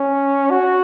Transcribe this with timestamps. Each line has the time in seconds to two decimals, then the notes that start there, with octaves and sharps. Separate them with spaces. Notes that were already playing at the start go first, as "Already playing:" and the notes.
Already playing: C#4
0.50 F#4